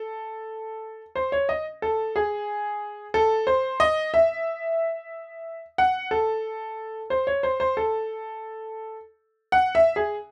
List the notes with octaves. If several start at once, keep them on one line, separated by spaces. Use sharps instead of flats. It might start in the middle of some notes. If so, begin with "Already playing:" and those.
Already playing: A4
C5
C#5
D#5
A4
G#4
A4
C5
D#5
E5
F#5
A4
C5
C#5
C5
C5
A4
F#5
E5
G#4